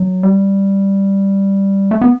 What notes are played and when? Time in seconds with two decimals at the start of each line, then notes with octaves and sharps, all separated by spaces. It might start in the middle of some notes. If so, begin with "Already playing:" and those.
Already playing: F#3
0.23 G3
1.91 A3
2.01 B3